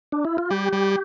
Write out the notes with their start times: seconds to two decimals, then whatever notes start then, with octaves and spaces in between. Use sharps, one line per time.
0.12 D4
0.25 E4
0.38 F4
0.50 G3 G4
0.73 G3